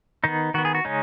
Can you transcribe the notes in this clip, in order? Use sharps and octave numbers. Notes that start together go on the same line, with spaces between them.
D#3 B3 D#4
D#3 B3 F#4
G#4
F#4
C#3 G#3 C#4 D#4